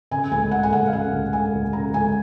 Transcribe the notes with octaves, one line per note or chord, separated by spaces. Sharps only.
C#3 G#5
C#2 G#5
G#3 F#5
G#5
C#2 F#5
F5
C#3 F#5
C#2
G#3 G#5
C#2
C#3 A#5
C#2 G#5